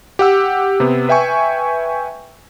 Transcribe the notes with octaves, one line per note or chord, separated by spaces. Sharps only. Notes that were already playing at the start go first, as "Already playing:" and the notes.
G4 F#5 E6
C3 B3
B4 E5 G5 G#5 C#6